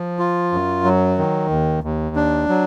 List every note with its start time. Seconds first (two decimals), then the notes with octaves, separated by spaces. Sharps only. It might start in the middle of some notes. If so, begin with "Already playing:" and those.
Already playing: F3
0.19 F4
0.52 F#2
0.84 F#3
1.18 D#3
1.50 D#2
1.83 D#2
2.16 D4
2.49 F#3